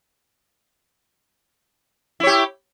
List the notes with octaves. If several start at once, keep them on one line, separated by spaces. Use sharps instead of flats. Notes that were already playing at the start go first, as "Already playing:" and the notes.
E4 G4 C#5